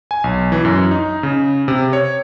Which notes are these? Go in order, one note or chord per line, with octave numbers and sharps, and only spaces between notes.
G#5
B1
E3
F#2
D#4
C#3
C3
C#5